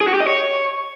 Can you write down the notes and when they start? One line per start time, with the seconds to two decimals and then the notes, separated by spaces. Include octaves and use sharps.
0.01 G#4
0.07 F#4
0.14 G4
0.20 D#5
0.27 C#5